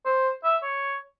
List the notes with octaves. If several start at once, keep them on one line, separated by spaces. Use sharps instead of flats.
C5
E5
C#5